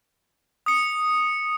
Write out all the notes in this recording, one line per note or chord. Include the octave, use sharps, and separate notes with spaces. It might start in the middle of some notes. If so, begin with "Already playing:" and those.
D#6 C#7